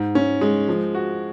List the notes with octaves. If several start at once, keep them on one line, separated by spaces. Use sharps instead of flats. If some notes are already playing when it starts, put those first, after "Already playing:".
Already playing: G#2
C#4
G#3
F3
F#4